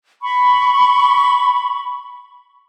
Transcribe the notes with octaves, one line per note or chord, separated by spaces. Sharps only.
B5 C#6